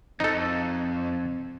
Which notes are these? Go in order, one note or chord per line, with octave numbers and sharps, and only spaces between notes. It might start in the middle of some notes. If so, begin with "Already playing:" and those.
F2 C4 D#4 A4